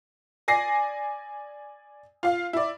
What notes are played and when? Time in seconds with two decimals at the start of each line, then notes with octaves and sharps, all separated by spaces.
0.48 D5 G#5 A#6 C7
2.23 F4 F5
2.53 E4 D5